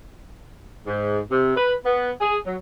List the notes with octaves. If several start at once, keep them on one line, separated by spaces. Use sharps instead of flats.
G#2
C3
B4
B3
G#4
F#3